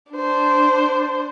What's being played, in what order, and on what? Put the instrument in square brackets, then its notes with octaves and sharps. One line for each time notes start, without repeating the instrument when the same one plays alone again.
[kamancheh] D4 C5